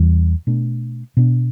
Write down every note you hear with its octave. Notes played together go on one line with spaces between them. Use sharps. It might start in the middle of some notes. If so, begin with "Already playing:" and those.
Already playing: E2 E3 G3
B2 A3 D4
B2 B3 D4